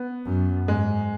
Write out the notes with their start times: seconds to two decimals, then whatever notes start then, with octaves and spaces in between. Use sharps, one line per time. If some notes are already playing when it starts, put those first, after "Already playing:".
Already playing: B3
0.25 F#2
0.67 G#2 G#3